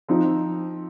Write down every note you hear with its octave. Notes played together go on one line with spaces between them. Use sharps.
F3 C4 D#4